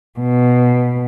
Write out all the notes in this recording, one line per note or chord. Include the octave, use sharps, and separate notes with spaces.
B2